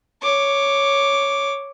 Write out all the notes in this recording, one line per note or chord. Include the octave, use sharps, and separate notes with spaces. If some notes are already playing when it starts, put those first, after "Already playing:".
C#5 D6